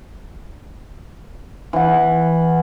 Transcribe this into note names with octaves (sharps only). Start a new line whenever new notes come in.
E3 F#5